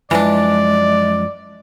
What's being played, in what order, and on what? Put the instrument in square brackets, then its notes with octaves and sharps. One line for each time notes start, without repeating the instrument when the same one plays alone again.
[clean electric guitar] F#2 F3 [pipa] E3 D4 [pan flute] G#3 [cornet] D5